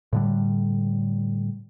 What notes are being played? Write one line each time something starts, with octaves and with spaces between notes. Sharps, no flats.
A2 D3 G3